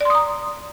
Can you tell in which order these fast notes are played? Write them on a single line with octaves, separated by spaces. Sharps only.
D5 C6 D#6 A#5